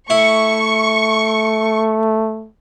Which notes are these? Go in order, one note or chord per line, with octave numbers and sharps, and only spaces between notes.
A3 E4 C#6